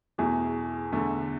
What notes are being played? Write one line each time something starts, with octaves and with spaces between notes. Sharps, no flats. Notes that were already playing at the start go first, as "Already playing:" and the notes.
E2 B2 A3 E4 G#4
E2 D3 A3